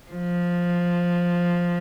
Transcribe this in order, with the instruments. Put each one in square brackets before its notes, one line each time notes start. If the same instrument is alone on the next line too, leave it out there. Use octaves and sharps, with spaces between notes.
[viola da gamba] F3